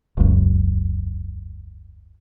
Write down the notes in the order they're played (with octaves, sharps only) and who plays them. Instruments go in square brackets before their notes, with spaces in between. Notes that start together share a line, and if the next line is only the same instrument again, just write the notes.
[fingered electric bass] E1 C#2 F#2